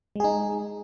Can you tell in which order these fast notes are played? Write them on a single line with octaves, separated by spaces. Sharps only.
G#3 G#4 D#4